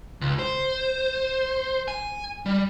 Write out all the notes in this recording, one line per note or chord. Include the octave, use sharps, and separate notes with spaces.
C#2
C5
G#5
G3